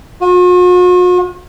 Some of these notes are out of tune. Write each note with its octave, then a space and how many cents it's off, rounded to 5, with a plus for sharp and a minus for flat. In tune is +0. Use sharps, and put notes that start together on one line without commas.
F#4 -45